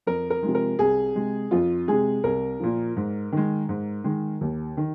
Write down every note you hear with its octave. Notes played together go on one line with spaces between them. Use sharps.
F2 A#4
A#4
C3 F3 G#3
A#4
C2 G#4
C3 G#3
F2 F4
C3 G#3 G#4
C2 A#4
A#2 F3
G#2
D#3 G#3
G#2
D#3 G#3
D#2
D#3